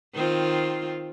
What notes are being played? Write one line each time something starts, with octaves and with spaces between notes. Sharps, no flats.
D#3 C4 F4